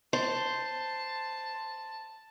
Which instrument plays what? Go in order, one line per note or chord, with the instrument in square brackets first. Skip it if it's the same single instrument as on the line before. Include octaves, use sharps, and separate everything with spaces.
[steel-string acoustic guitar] C5 [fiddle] A5